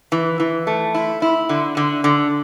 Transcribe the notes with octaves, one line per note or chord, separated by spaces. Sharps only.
E3
E3
A3
E4
E4
D3
D3
D3